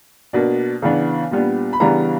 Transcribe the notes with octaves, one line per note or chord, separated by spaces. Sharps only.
B2 A#3 D4
C#3 E3 B3 D4
A#2 G3 B3 D4
B5
C#3 E3 G3 B3 D4 A#5